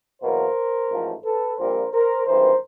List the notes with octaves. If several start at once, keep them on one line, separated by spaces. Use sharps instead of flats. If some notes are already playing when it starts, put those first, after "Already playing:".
E2 B2 F#3 A#3 A#4 C5
A1 G#2 F3 A3
A4 B4
A#1 A#2 G3 C4 A#4 C5
A#4 C5
G#1 G2 E3 A#4 C5